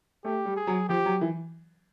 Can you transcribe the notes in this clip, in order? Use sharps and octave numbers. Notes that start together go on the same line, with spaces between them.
A3 G4
G3
G#4
F#3
F3 G4
F#3
E3